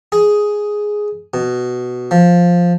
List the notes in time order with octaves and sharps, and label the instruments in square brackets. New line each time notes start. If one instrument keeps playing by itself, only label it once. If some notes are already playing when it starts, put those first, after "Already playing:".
[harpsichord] G#4
B2
F3